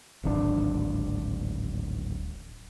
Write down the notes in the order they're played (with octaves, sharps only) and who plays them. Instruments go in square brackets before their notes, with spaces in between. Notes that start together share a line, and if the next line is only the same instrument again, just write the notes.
[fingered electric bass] D1 G#1 D4